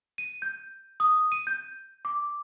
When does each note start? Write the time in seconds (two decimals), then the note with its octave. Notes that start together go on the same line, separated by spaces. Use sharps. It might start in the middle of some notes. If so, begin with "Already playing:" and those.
0.18 D#7
0.42 G6
1.00 D#6
1.32 D#7
1.47 G6
2.05 D6